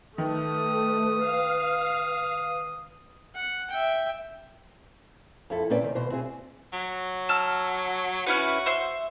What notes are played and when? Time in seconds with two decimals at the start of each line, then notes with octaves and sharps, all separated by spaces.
0.18 D#3 A3 B4 D#6
1.24 F5
3.35 F#5
3.70 E5 G5
5.50 F2 E4 A4
5.70 A#2 C4 C#4 B4 D5
5.82 C3 D#3
5.95 B2 C5
6.10 C4 E4 F#4 G#4
6.73 F#3
7.29 A5 E6 F6
8.26 C#4 E4 F#4 B4
8.66 C5 E5 C6